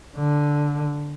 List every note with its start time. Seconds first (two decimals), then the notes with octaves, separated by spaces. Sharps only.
0.17 D3